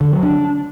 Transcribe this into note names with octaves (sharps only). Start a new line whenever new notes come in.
D3
F#3
D4